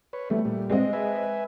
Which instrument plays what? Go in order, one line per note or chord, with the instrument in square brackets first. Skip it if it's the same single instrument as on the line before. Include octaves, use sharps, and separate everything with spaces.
[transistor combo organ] B4 C#5
[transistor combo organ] E3 G3 B3 [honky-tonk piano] A3
[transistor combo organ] A#2 G3
[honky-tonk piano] G#3 C4 D#5
[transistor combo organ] B4 E5 G#5